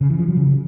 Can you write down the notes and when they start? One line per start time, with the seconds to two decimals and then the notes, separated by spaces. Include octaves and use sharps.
0.01 C#3
0.10 E3
0.19 F3
0.28 F#3
0.37 C#3